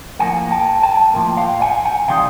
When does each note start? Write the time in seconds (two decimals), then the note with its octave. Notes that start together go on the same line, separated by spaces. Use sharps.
0.19 A2 F3 A#3 F#5 G#5
0.51 G5 A5
0.82 G5 A5
1.14 A2 F3 A#3
1.37 F5 G5
1.61 F#5 G#5
1.85 F#5 G#5
2.08 C3 E3 G3 C4 D#4 F5 G5